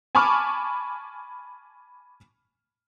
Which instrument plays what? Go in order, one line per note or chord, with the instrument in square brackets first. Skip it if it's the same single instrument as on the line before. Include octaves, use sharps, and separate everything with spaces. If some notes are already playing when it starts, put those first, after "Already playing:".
[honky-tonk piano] G#5 A5 B5 C#6 D6 F6